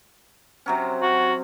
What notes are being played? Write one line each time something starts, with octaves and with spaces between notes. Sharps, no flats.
C3 F#3 C#4
F#4